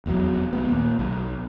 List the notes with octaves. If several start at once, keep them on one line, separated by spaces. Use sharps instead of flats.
F1 E2 A2 F#3
B1 A3 B3
D#2 A#2
B1